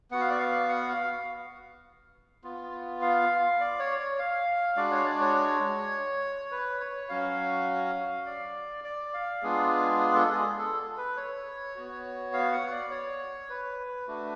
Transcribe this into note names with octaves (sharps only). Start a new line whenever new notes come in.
B3 F#4 F#5
F5
D5
F5
F#5
F5
B3 F4
F5
D5
C#5
C#5
F5
G#3 D4 F#4 D5
C#5
D5
C#5
B4
C#5
F#3 C#4 F#4 F5
D5
D5
F5
G#3 B3 D4 F4 G#4
G#4
A4
G#4
A4
B4
C#5
B3 F#4
F5
F#5
D5
C#5
B4
A3 D4 F#4